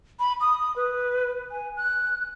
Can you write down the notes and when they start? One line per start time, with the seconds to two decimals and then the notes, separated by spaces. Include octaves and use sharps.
0.19 B5
0.41 D#6
0.76 B4
1.51 G#5
1.77 F#6